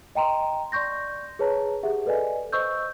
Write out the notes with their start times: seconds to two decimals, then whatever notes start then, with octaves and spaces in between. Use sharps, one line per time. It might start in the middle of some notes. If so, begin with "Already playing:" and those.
0.15 D#5 G5 A#5 C6
0.72 D5 C6 C#6 G6 A#6
1.39 G#4 B4 C#5 A5 A#5
1.83 G4 G#4 E5 F#5
2.06 A4 B4 D5 D#5 G#5
2.53 C5 D#5 C#6 E6 G6